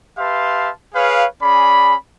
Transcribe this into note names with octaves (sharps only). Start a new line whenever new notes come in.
G4 B4 E5 F5 A5 C6
G#4 B4 C#5 F5
C#4 G#4 D5 B5